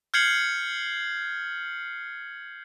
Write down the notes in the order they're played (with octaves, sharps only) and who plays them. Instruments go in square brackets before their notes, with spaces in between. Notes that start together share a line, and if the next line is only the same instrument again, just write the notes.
[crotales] F6 G6 G#6 C7 C#7 F#7